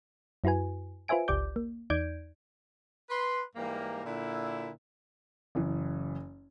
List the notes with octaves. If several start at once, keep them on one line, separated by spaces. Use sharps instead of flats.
F#2 E4 F#4 B4 G#5
F4 B4 C5 E5 G#5 D7
G1 C#2 G4 D5 D6 G6
A#3
E2 D#4 D5 G6 G#6 D7
B4 C6
G#2 E3 G3 A#3
A#2 D3 E4
F#1 E3